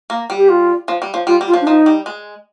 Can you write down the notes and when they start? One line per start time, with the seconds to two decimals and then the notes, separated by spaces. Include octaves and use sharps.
0.10 A#3
0.30 G3
0.37 G4
0.49 F4
0.88 F3
1.02 G3
1.14 F3
1.27 G3 F4
1.41 G3
1.47 F4
1.54 F3
1.61 D4
1.66 F3 D#4
1.86 G3
2.06 G#3